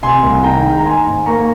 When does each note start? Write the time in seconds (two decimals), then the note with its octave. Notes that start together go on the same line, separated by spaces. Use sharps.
0.03 C3 G#5 C6
0.23 C2
0.43 D#3 G5 A#5
0.65 G#3
0.77 A#5
0.85 D#3 G#5 C6
1.06 G#2
1.26 A#3 A#5 C#6